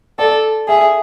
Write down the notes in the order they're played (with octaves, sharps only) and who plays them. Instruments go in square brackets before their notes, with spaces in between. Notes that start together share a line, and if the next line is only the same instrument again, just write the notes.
[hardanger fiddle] A4 [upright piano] D5
[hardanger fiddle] G#4 [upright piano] E5